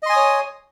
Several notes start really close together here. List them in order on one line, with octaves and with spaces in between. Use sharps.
D#5 C6 G#5 D#6 C#5